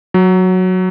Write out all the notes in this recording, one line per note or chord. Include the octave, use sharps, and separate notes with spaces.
F#3